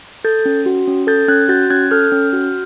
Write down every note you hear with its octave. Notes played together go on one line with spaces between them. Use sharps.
A4 G6 A6
C#4
F#4
C#4
A4 G6 A6
C#4 F#6 G#6
F#4 G6 A6
C#4 F#6 G#6
A4 F6 G6
C#4
F#4